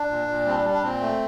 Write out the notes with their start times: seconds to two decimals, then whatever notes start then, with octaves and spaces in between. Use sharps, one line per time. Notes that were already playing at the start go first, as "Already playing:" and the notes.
Already playing: D4
0.10 A#2
0.28 A#2
0.46 G3 C4
0.56 D4
0.64 G3
0.74 D4
0.83 A#2 C4
1.01 A3